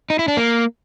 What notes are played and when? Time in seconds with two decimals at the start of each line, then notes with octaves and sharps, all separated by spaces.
0.10 D#4
0.19 E4
0.28 D4
0.37 A#3